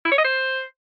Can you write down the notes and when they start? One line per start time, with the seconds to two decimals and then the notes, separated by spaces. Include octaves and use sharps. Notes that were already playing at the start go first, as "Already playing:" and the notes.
0.05 E4
0.12 C#5
0.18 D#5
0.24 C5